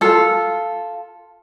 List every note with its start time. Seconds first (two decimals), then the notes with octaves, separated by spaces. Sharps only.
0.01 F4 A4